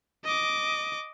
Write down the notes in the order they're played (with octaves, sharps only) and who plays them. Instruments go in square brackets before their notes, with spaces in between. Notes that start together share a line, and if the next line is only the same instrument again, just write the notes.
[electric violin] D#5 D6